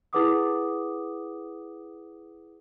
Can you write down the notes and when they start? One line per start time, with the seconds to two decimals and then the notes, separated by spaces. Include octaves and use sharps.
0.13 E4 G#4 B4 F#5 D6 D#6